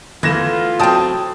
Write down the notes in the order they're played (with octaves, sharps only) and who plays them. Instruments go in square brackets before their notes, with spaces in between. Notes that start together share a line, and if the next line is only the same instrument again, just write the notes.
[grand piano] E3 A3 [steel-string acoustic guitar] B3 [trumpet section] F4 [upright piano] G#6 A#6 E7
[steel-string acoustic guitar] F#3 C4 [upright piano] G5 A5 D#6